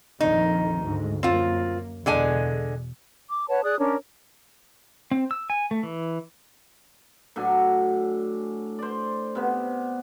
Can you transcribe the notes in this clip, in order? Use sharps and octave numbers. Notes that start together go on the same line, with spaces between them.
A#1 F2 D#3 D#4
D2 G#2
F#2 A#3 C4 F4
E2 B2 D3 G#3 G#5
D6
B4 C#5 F#5 A5
G#4 D5 D#6 F#6
C#4 D4 A#4 C#5
C4
E6
G#5
A3
E3
A2 F#3 D4 G#5
C5 D5
C3 B3